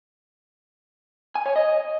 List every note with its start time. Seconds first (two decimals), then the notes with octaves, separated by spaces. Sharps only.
1.35 G#5
1.46 C#5
1.56 D#5